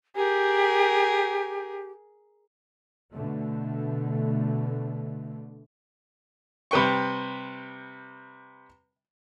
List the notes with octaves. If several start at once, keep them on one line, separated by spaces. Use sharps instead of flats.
G4 G#4 A#4
B2 D3 A3
C3 G3 B4 G5 C#6